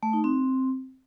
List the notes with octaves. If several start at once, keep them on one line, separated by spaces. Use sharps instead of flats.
A3
D#4
C4